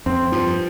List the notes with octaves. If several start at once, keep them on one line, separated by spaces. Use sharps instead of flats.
F2 C4
G2 F3